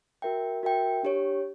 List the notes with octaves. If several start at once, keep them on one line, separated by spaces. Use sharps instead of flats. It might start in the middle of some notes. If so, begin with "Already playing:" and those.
F#4 A#4 E5 G5
F#4 A#4 E5 G5
D4 G4 C#5